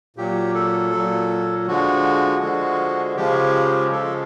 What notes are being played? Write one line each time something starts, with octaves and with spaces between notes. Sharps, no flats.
A#2 F#3 G4
A4
A#2 F#3
D3 F3 G#3 F#4
D3 F3 G#3
C#3 F3 G#3 G4
C#3 F3 G#3 A4